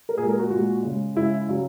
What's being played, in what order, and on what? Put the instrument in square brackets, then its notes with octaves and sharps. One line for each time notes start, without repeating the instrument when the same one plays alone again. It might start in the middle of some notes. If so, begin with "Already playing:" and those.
[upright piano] A#4
A#2 G#4
G#3
A#4
F#4
A#2 G#3 F#4
C#3 G#3
C#3 G#3 E4
C#3 F#3